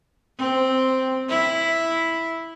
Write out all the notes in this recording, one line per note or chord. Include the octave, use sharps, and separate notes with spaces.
C4
E4